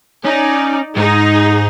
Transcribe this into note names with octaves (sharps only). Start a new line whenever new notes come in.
C#4 D#4 D5
G#2 D#4 G#4